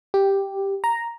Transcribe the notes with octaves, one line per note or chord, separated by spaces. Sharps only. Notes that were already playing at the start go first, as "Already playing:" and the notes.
G4
A#5